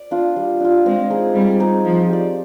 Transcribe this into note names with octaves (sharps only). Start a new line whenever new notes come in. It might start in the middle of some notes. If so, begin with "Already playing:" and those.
Already playing: D5
D4 F4
G3
D4 F4
G#3 C4
D#4 G#4 D#5
G3 C4
D#4 G#4 D#5
F3 D#4
G4 D5